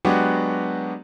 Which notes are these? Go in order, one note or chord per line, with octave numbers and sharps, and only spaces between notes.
F#3 G#3 B3 D4 F#4 G4